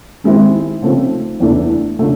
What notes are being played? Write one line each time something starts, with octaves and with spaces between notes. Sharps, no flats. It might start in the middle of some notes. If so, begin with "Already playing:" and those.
D#3 G#3 C4 E4
C#3 F3 A3 C4 D#4
E2 C#3 E3 A3 D4
C#3 F3 A3 D4